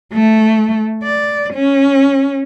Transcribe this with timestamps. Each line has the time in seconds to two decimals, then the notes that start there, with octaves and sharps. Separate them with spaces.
0.13 A3
1.03 D5
1.54 C#4